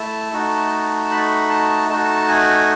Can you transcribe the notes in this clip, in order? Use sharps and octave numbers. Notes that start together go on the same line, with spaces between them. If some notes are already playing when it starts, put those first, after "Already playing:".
Already playing: A3 E4 A5
A3 D#4 F#4
B5
A5
A3 D#4 F#4 A5
G#5